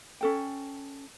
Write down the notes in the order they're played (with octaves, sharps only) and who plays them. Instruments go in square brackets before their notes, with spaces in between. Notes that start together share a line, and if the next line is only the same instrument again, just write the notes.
[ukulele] C#4 A4 G5